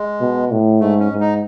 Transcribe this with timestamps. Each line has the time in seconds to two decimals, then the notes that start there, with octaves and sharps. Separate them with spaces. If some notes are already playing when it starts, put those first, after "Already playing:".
Already playing: G#3
0.21 B2
0.51 A2
0.80 G#2 A3
1.00 C#4
1.11 G#2
1.20 D#4